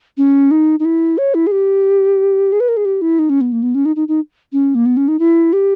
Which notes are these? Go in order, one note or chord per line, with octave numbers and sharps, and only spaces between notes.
C#4
D#4
D#4
E4
C#5
E4
G#4
G4
G#4
B4
A#4
G#4
G4
E4
D#4
C#4
B3
A#3
B3
C#4
D#4
D#4
D#4
C#4
A#3
B3
C#4
D#4
E4
G4